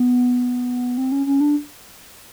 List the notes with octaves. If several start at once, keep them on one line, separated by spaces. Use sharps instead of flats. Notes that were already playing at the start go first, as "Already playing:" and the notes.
Already playing: B3
C4
C#4
C#4
D4